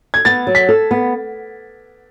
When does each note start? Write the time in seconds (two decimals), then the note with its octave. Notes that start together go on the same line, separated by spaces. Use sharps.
0.14 G#6
0.25 B3 A6
0.47 F#3
0.55 B6
0.69 A4
0.91 B3